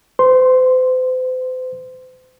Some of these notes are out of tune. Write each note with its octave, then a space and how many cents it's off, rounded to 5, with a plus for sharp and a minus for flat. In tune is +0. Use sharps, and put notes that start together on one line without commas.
C5 -40 C6 +0